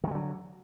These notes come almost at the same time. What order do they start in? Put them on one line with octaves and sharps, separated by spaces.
D#3 G#3 D3 F#3